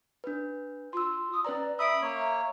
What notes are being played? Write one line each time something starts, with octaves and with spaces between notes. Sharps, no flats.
D4 B4
F4 C6 E6
D#6
C#4 B4 D5 A#5
E5 B5 D#6 E6 D7
A#3 C#5